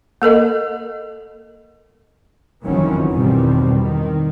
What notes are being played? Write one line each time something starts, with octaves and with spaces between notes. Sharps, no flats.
A#3 A4 A#4 D#5
F#1 F2 D#3 E3 F#3 C#4
E2 G2 B2 D#3 G3 C4
D#3